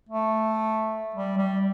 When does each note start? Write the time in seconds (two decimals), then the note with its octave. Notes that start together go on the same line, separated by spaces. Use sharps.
0.09 A3
1.15 G3
1.38 G3